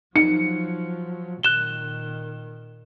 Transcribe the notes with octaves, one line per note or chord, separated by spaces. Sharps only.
F3 F#3 D#4 C#7
A#2 D#3 F#6 E7 G7